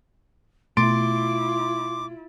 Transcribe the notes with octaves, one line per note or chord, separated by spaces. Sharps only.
B2 A3 E4 F4 C6 D6 A6 D7